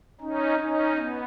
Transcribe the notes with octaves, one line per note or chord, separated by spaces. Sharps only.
C#4 D#4
C#4 D#4
B3